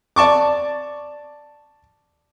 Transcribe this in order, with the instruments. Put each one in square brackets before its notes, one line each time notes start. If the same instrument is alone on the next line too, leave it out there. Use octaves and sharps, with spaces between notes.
[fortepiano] D5 A5 C#6 D6